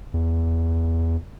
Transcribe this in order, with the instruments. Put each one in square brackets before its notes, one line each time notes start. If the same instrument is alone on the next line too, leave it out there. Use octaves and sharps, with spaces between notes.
[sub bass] E2